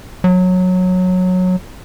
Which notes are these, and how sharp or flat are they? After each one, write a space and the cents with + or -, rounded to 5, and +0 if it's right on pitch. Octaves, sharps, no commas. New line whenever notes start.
F#3 -15